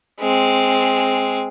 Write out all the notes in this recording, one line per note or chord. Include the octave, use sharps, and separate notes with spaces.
G#3 C4